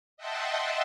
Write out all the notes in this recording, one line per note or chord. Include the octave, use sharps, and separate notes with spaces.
D#5 E5 F#5 G5 A5 C6